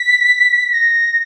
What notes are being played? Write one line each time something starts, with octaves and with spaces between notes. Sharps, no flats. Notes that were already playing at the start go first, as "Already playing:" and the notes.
Already playing: B6
A#6